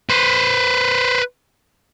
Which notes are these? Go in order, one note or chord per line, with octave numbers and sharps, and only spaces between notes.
B4 C5